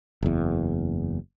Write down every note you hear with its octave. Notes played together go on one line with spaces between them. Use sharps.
F#1 E2